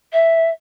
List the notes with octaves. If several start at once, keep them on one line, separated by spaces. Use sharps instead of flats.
E5